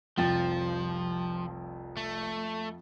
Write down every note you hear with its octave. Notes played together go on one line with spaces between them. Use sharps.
F1 C2 F2 F3 G5 A6
A3